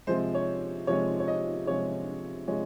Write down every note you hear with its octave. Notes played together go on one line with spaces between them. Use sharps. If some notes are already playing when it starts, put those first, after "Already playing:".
C3 F3 G#3 C5
C#5
C3 F3 G#3 C#5
C#5
D#5
C3 F3 G#3 C#5
C3 F3 G#3 C#5